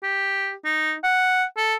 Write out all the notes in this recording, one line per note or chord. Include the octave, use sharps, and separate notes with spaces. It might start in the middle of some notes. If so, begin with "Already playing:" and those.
G4
D#4
F#5
A4